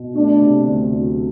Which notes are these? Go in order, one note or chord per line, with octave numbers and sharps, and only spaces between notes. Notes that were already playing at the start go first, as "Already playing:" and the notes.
Already playing: B2
A3 D4
C3
D2
F#3